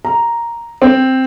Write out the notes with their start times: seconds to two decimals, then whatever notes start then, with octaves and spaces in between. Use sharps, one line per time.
0.05 A#5
0.82 C4